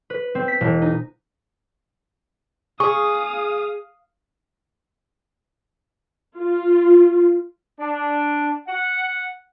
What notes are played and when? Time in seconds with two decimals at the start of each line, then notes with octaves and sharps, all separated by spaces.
0.10 B4
0.35 C4
0.48 B6
0.61 E1
0.82 D#4
2.80 G#4 F5 C#6 D#6
6.38 F4
7.80 D4
8.67 F#5